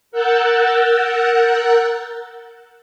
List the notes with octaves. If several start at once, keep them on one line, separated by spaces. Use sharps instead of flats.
A#4 F#5 E6 F#6 G6 A6